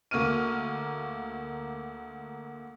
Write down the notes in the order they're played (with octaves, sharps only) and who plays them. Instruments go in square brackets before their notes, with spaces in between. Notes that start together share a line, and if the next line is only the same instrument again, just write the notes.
[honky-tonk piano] D2 A#3 C#6 F6 D#7